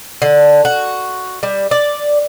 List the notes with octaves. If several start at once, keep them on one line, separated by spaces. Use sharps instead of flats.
D3
F#4
G3
D5